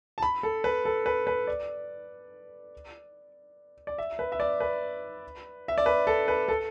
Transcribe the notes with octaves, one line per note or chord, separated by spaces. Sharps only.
A5
B5
A4
B4
A4
B4
B4
D5
D5
E5
B4
E5
D5
B4
E5
D5
B4
A4
B4
A4